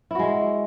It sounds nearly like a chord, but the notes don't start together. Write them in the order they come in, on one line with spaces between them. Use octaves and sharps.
E4 F#4 G#3